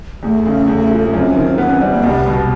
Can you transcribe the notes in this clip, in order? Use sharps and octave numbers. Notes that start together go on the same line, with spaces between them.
E2 A3
C#3
E2
F3
F#2 C4
D#3
B3 C#4
C4
G3
A#3
C2 B3
B2